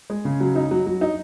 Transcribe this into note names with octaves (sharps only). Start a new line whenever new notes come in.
G#3
C#3
F#3
D#4
F#3
F#3
D#4